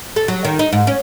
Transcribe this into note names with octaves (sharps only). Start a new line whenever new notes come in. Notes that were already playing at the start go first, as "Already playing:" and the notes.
A4
F#3
D#3
D#4
G#2
C#4